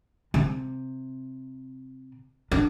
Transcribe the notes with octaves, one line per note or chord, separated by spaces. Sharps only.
C3
D4